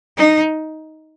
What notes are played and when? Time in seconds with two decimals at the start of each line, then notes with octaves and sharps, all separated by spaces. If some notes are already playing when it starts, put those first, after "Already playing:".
0.17 D#4